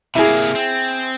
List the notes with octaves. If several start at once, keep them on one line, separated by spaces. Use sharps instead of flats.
C3 A#3 E4 G#4
C4